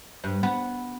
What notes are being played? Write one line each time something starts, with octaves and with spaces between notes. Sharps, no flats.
G2
B3